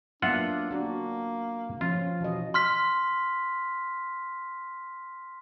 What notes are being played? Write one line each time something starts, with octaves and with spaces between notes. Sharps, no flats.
F#3 A#3 B3 D4 F4 E5 F#5
A#3 D4 F#4
F3 C#4 F4
B2 E3 D#5
C6 F6 B6